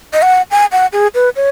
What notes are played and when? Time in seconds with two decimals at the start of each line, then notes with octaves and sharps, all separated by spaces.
0.13 D#5
0.22 F#5
0.51 G#5
0.72 F#5
0.93 G#4
1.15 B4
1.36 C#5